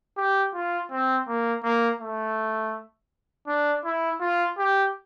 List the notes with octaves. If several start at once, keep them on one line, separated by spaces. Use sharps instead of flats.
G4
F4
C4
A#3
A#3
A3
D4
E4
F4
G4